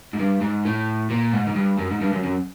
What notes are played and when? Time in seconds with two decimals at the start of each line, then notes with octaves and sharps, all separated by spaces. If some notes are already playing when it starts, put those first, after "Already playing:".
0.14 G#2
0.19 G2
0.41 G#2
0.65 A2
1.10 A#2
1.32 G#2
1.47 G#2
1.55 G2
1.78 F#2
1.90 G#2
2.01 G2
2.12 F#2
2.23 F#2